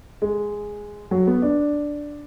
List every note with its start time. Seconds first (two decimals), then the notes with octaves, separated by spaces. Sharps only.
0.22 G#3
1.11 F#3
1.27 B3
1.42 D4